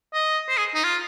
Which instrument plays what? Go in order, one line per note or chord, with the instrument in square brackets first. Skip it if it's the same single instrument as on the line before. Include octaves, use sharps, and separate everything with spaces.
[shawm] D#5
C5
G#4
D#4
F4